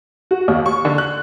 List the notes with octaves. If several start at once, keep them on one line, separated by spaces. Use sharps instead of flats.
F#4
D#2
C#6
D3
F#6